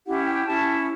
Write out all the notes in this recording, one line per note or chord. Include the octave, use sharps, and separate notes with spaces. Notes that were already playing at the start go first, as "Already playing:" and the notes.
C#4 E4 G4 F#5
G5
C#4 E4 A5